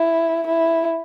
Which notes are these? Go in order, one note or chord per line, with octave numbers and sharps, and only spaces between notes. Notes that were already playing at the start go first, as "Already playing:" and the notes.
Already playing: E4
E4